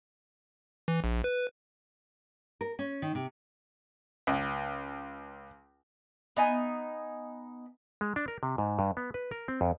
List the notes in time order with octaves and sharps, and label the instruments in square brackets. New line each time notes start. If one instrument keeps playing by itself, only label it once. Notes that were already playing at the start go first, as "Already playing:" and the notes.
[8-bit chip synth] E3
A#1
B4
[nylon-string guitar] A#4
C#4
D#3
C3
[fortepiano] C#2
[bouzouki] B3 D#4 G#5
[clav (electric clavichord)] G#3
D4
A#4
C3
G#2
G2
B3
B4
A#4
C4
F2